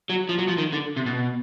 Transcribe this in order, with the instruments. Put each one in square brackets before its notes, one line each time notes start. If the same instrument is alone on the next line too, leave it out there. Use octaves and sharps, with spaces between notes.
[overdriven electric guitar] F#3
F3
F#3
F3
D#3
D3
C3
B2